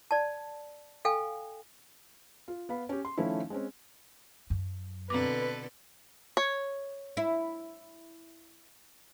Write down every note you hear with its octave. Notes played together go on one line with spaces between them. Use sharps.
D5 A5
A4 F5 G5 G#5
F4
B3 F5 B5
C#4 G4
C6
D#3 F3 A3 C#4 E4
G#3 C4 C#4
F#2
B2 D3 C4 A4 B4 D6
C#5
E4